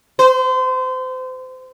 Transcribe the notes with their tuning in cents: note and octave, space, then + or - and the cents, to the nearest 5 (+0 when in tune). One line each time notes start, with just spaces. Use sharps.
C5 -30